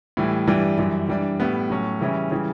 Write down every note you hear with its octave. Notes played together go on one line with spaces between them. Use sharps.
A2 E3 G3
G2 E3 G3 D4
F#2 E3 G3
E3 G3 D4
A2 G3 B3
A2 F#3 C#4
C#3 E3 G3 C#4 E4
C#3 E3 G3